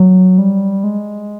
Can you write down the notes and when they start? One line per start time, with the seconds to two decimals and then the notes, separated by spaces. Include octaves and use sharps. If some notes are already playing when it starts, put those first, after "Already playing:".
Already playing: F#3
0.38 G3
0.84 G#3